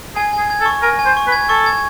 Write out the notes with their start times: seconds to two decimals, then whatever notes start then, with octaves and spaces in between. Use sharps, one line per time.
0.16 G#4 G#5
0.33 G#4 G#5
0.50 G#6
0.61 A4
0.66 C#6
0.82 A#4 G#5
0.99 G#5
1.05 C5
1.17 C#6
1.27 B4
1.32 G#6
1.49 A4 C#6
1.66 G#6